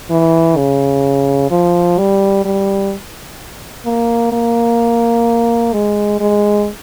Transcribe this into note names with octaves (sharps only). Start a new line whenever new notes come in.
E3
C#3
F3
G3
G3
A#3
A#3
G#3
G#3